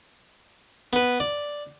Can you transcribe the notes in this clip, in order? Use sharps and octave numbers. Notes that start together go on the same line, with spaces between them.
B3 B4
D5